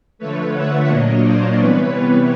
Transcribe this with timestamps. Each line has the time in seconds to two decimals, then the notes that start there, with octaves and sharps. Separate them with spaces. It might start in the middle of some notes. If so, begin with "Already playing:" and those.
0.19 D3 F3 A3 B4 C#5
0.54 E5 F#5
0.88 A#2 F#3 A#3 D4 C#5 D#5
1.23 C5 D5
1.57 C3 E3 G3 B3 B4 C#5